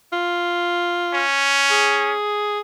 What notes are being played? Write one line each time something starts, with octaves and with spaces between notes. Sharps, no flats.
F4
C#4
G#4